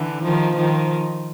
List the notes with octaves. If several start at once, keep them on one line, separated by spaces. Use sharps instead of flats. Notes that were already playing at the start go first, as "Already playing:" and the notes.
Already playing: D3 E3
D#3 F3
D#3 F3